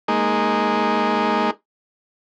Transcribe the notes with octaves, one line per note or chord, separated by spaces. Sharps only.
G#3 A#3 D#4